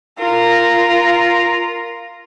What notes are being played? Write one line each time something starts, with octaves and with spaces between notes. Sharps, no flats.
F4 A#4